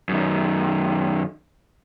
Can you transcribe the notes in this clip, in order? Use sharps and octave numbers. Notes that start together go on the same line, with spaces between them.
F#2 D#3